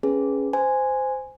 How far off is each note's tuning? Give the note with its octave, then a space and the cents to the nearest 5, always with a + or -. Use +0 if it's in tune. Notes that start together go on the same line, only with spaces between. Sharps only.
C#4 +0 G#4 +0 B4 +0
C5 -15 G#5 -5